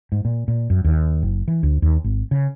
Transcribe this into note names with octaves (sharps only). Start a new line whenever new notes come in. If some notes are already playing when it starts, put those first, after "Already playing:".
G#2
A#2
A#2
F#2
D#2
F#1
E3
D2
D#2
G#1
C#3